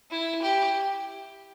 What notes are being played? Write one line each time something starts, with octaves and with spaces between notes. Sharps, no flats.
E4
G4